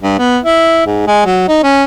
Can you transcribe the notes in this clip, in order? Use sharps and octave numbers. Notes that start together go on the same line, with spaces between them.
G2
B3
E4
G#2
G#3
F#3
D#4
C#4